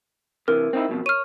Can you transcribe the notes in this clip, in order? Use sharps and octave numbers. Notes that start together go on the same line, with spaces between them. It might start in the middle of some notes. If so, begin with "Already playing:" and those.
C3 E3 A#4
C4 D#4 E4
F2 B2 F#3
C#5 F6 D#7